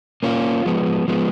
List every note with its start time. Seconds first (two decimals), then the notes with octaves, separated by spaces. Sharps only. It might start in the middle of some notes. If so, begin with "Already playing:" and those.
0.23 A#3 C#4 F4
0.65 F3 G#3 B3
1.08 F3 G#3 B3